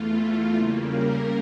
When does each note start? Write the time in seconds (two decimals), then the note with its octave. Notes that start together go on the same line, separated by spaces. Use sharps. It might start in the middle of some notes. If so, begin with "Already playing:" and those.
Already playing: E2 E3 A3 F4
0.53 C#3 G3 A#3
0.86 A#4